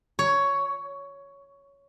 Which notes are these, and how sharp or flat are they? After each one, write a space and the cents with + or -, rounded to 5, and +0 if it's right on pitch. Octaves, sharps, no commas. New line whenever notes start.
C#5 +10